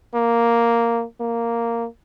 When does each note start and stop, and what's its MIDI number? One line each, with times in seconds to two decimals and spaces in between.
0.15 1.04 58
1.20 1.86 58